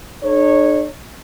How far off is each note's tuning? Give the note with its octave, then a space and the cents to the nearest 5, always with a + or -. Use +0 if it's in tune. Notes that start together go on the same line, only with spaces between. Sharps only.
D4 +45 A4 -40 C#5 -15